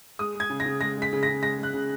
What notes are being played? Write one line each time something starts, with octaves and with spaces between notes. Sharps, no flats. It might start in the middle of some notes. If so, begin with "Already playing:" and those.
G#3 D#6
G#3 G#6
C#3
A#6
C#3
G#3 A#6
G#3 B6
C#3
A#6
C#3
G#3 A#6
G#3 F#6
C#3